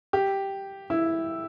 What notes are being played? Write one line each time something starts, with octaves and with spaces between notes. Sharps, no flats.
G4
E4